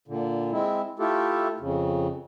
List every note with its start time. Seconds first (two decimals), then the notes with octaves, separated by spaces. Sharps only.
0.08 A#2 D3
0.52 G#3 C4 E4
0.99 A3 E4 F4 G4 A4
1.60 F2 C#3